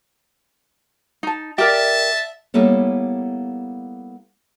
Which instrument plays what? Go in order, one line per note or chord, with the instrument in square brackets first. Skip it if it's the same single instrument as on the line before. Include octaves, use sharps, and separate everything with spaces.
[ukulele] D#4 A5
[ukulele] G4 A#4 D5 [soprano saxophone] E5 [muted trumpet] A5
[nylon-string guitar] G3 A#3 B3 E4 A4 C#5